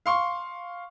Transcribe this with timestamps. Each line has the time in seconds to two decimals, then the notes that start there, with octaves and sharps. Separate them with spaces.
0.06 F5 C6 C#6